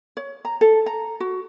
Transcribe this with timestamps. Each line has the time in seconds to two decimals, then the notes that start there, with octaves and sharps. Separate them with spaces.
0.17 C#5
0.45 A#5
0.61 A4
0.86 A#5
1.20 F#4